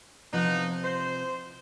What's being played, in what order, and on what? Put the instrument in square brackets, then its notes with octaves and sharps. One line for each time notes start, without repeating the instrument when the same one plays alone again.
[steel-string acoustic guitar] C3 F3 F4 [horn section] B3 D#4
[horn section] C5